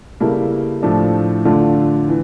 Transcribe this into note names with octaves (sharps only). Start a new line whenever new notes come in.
C#3 G3 A#3 E4 A4
A2 F3 A3 D4
D3 A3 D4 F4
E3